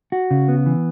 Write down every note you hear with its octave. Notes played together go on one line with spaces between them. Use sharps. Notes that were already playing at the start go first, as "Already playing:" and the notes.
F#4
C#3
B3
E3